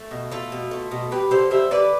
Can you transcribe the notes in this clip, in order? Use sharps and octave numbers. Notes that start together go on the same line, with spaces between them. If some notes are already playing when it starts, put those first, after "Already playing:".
Already playing: A3
B2
A3 F4 A4
B2
A3
B2
G3 G4 B4
D3 A4 C5
G3 C5 E5
D3 B4 D5